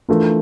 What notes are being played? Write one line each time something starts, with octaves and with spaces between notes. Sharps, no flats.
E3 A3 D4 F4 A#4